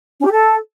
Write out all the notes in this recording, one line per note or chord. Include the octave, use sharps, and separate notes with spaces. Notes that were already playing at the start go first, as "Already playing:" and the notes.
C#4
G4
A4